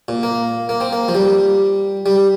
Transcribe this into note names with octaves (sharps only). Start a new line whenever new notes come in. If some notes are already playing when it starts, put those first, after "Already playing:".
A#2
A#3
A#3
C4
A#3
F3
G3
G3